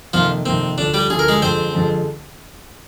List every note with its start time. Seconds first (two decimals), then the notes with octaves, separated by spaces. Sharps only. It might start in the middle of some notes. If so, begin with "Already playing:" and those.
0.13 F2 C3 D#3 F3 A#3 F4
0.45 F2 C3 D#3 A#3 C4
0.78 D2 D3 F3 D4
0.94 G3 G4
1.10 D2 D3 F3 G#4
1.19 A#4
1.28 G#3 G#4
1.42 F2 D3 F3 G#3 C4 C5
1.74 F2 D3 F3 G#3